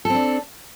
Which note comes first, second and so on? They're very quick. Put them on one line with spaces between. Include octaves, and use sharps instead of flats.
A4 C4 D4